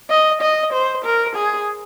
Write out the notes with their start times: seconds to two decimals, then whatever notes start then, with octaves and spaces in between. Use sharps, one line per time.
0.10 D#5
0.42 D#5
0.74 C5
1.05 A#4
1.36 G#4